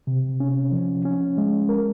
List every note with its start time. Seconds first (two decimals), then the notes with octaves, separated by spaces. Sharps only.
0.07 C3
0.40 C#4
0.72 F3
1.05 C#4
1.38 G#3
1.69 A#4